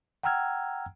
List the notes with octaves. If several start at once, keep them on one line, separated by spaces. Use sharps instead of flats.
F#5 G5 A#5 E6 F6 G#6